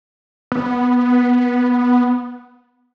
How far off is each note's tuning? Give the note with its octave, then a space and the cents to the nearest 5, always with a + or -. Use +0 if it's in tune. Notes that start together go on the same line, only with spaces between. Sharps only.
B3 -5